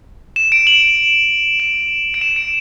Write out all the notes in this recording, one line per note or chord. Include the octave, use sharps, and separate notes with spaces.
E7
D7
F#7
E7
D7
E7
D7